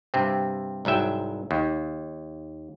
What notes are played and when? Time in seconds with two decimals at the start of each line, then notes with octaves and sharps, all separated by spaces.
0.14 G2 C3 C4
0.85 C2 G#2 F#3 E5 G5
1.51 D#2